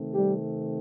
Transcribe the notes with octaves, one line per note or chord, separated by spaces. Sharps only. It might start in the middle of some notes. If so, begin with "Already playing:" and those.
Already playing: C3 D#3 A3 C4
G3 G4